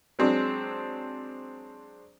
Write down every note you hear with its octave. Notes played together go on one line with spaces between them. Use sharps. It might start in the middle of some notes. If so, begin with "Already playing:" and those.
F#3 G#3 C4 D4